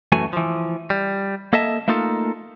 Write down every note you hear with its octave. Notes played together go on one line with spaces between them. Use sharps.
F#2 E3 A3 F#4 G#5
E3 F3
G3
A#3 A4 D#5 E5 A5
A3 A#3 D#4 F4 A4